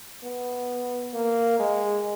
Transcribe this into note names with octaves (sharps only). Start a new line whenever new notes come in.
B3
A#3
G#3